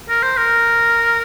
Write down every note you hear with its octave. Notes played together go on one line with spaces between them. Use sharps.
A#4
C5
A#4